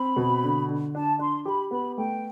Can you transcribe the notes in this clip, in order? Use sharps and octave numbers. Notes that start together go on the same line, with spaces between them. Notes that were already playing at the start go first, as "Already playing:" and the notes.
Already playing: C4 B5
B2
D3
D3
D4 A5
D4 C6
G4 B5
B3 B5
A3 G5